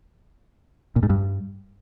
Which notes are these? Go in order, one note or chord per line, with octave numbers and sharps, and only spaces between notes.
A#2
G#2
G2